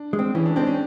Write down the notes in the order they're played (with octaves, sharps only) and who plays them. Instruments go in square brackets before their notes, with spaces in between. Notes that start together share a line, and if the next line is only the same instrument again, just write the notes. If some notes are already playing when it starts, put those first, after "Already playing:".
Already playing: [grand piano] D4
[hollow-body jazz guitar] G#3
C4
[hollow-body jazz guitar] E3 [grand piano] C#4
[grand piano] D4
[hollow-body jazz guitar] G#3 C4 [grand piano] D4
[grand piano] C#4